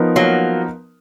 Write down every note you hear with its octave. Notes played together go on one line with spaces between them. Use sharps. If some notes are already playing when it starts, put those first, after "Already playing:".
Already playing: F3 B3 D#4 A#4
F#3 A#3